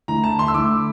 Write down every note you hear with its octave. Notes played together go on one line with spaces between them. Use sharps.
D3 A3 E4 A#5
A5
C6
E6
D3 A3 E4 D6